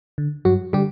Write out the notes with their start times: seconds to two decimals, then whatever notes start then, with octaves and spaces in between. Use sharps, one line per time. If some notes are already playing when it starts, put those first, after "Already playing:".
0.18 D3
0.45 G2 F#3 F#4
0.73 D3 G3 G4